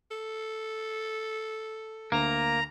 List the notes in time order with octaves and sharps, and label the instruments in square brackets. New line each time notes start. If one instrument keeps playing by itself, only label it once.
[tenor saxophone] A4
[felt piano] D2 [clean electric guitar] A#3 [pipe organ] A#5